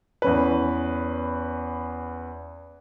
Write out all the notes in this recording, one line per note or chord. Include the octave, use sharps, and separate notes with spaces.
E2 C#4 B4